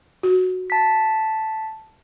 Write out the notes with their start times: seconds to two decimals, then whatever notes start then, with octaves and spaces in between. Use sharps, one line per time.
0.23 F#4
0.70 A5 B6